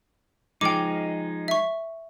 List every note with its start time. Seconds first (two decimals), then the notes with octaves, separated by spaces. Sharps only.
0.61 F3 G#3 D#4 G5 D6
1.48 E5 C#6